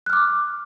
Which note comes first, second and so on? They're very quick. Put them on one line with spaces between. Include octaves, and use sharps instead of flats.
F#6 F6 D6